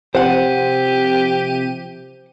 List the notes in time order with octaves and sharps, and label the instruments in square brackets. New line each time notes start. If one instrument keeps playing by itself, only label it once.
[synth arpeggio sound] C3 F3 D#7 [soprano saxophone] G4 [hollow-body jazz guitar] C5 F#5